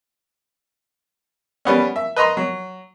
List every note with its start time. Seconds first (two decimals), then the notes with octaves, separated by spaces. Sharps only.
1.65 G3 B3 C#4
1.96 E5
2.16 B4 D#5 A#5 C6
2.37 F#3